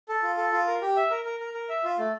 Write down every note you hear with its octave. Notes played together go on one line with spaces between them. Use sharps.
A4
F4
A4
F4
A#4
G4
E5
A#4
A#4
A#4
A#4
E5
F4
A3